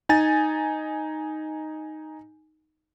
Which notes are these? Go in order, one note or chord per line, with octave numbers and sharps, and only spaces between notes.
D#4 G#5 A6